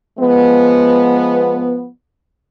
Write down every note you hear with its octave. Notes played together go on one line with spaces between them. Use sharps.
F3 G#3 B3